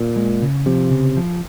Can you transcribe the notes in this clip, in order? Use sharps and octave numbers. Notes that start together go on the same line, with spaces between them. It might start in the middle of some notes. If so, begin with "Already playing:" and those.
Already playing: A#2
G#3
C#3
C3 F3
C#3
F3